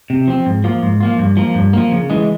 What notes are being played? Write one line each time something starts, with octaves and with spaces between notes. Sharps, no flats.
C3
F3 C4
G#2
F3 A#3 F4
G#2
F3 A#3 F4
G2
F3 A#3
G2
F3 A#3
C#3
E3 G#3